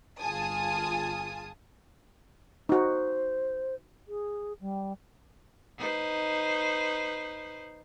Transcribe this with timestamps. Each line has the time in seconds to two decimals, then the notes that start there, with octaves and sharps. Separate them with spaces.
0.21 G1 F4 G#4 G#5 A5 D#6
2.69 D#4 F#4 C5
4.07 G#4
4.60 G3
5.77 D#4 B4 C5